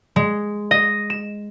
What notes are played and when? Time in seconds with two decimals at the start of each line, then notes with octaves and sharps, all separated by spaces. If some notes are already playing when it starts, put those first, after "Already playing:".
0.16 G#3
0.71 D#5
1.10 E7